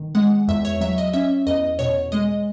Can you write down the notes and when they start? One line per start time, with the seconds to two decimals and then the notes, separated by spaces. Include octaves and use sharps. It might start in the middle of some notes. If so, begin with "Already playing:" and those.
Already playing: D#3
0.15 G#3 F#5
0.48 E2 E5
0.65 C#5
0.81 F#3 E5
0.98 D#5
1.13 C#4 E5
1.46 E2 D#5
1.79 B2 C#5
2.12 G#3 D#5